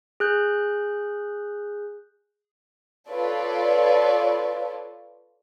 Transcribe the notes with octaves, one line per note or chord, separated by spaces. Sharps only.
G#4 F#6 G6
F4 A4 B4 C#5 D5